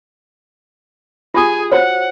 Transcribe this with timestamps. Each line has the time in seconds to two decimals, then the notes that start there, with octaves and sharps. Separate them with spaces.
1.34 F4 G4 G#4 G#5 D#6
1.72 F#4 C5 C#5 F#5